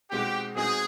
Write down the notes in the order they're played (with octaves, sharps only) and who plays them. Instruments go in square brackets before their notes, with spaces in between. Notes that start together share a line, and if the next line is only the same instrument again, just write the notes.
[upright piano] B2 G#3 C4 D#4 F#4 [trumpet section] G4
[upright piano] B2 G#3 C4 D#4 F#4 [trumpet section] G#4